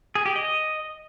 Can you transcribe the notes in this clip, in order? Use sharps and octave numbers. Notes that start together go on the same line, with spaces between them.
G#4
G4
D#5